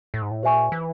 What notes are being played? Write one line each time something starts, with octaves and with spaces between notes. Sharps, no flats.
A2
G#2
A2
A#2 G4 C5 E5 G#5 C#6
E3